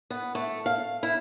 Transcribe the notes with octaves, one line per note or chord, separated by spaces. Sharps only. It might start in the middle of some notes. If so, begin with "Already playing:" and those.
B3
A3
F5
E4